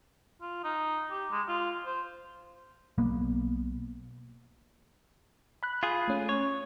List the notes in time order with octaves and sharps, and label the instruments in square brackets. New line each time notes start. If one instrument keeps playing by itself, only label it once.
[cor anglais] F4
D#4
G4
G#3
F4
C5
[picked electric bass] B1 A#3 B3
[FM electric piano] B5 F#6
[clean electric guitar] F4 G#4
[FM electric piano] A3 C#4
[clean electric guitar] C#5